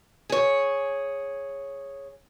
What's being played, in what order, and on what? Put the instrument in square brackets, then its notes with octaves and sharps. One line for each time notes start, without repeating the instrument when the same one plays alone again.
[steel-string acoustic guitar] G#4 C#5